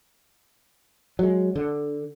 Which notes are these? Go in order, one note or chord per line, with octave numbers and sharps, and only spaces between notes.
F#3 G#3
D3